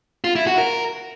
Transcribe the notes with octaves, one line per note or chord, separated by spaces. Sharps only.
F4
E4
F#4
A#4